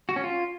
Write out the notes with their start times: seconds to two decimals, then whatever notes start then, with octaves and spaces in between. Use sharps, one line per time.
0.09 F#4
0.16 C#4
0.24 F4